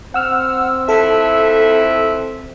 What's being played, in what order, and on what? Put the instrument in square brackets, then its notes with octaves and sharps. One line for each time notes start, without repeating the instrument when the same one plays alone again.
[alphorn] C4 [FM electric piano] F#5 E6 F6
[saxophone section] F2 E4 E5 [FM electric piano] A4